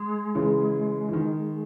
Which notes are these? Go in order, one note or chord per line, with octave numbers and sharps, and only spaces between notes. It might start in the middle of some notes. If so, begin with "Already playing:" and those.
Already playing: G#3
C#3 E3
E3
D#3